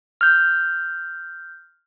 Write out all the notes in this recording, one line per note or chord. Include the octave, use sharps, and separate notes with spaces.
F6 G6